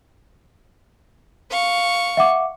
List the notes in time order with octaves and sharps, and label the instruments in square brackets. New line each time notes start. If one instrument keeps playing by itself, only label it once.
[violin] F5 C#6
[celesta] E5 F#5 D6